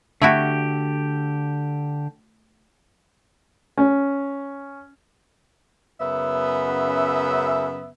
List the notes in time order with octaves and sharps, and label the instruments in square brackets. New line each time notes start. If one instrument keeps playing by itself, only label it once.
[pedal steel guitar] D3 G4 [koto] A3 E4 F#4
[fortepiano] C#4
[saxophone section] F#2 C#3 B3 E5